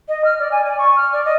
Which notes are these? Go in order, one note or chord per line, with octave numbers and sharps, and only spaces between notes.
D#5
F6
D5
G#5
D5
C#6
F6
D5
D#5